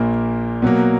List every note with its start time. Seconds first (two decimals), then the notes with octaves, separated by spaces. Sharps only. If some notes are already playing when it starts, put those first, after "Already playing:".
Already playing: A#1 A#2 A#3
0.62 B2 F#3 A#3